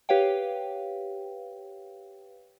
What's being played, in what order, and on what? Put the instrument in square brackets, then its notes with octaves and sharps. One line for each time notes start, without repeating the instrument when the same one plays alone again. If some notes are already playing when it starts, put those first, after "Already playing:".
[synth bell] G4 B4 C#5 F5 G5